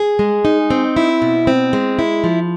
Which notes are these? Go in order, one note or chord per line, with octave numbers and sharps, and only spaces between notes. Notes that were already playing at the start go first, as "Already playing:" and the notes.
Already playing: G#4
G#3
D#4
C4
E4
B2
C4
G#3
E4
F3